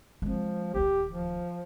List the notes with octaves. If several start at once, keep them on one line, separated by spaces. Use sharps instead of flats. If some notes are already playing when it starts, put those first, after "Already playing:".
F3 G#3 C4
D1 D#2 G4
F3